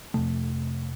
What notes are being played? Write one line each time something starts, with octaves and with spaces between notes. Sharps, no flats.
F2 C3 A3